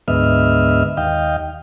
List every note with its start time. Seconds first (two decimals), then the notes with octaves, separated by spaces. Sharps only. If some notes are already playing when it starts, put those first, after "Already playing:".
0.08 D2 G#2 B3 D#5 E5 F6
0.97 D#2 D#5 F5 G5